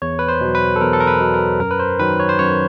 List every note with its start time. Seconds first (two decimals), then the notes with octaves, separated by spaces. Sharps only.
0.02 E2 C#5
0.19 B4
0.28 C5
0.41 B2 F#3
0.55 B4
0.76 A4
0.81 E2 A#4
0.93 A4
1.00 A#4
1.07 B4
1.21 B2 F#3
1.34 A#4
1.60 F#2 A#4
1.71 B4
1.80 C5
1.99 D#3 F#3 B4
2.20 C#5
2.29 C5
2.39 F#2 C#5